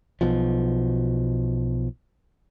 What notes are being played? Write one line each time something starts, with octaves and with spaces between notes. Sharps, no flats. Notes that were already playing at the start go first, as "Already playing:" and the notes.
B1 B2 F3